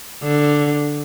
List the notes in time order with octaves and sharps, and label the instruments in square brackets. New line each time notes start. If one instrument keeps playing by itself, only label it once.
[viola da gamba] D3